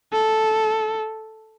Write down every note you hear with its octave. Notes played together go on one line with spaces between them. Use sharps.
A4